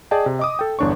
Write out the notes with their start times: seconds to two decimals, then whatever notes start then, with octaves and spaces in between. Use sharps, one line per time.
0.11 G#4 D5 D#5 G5 A5
0.26 C3
0.39 D#5 D6 D#6
0.59 A4 G5
0.79 G1 E2 D4 C#5 C#6